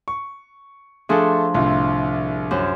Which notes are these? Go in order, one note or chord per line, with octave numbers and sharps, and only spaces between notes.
C#6
F3 A3 D4 G#4 A4
C2 A2 D3 F4
F#2 C5